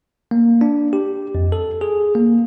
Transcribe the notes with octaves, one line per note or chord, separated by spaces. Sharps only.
A#3
D4
G4
F2
A4
G#4
A#3